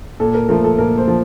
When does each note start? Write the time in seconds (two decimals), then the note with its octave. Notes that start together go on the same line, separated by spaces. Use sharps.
0.20 A#2 A4
0.34 A#4
0.49 F3 A3 A#4
0.64 A4
0.78 A#2 A#4
0.98 C5
1.08 F3